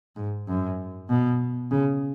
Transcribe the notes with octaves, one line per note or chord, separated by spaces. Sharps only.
G#2
F#2
B2
C#3